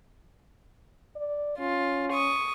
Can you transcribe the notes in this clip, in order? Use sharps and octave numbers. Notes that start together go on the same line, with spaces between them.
D5
C#4 F4
C#6 D#6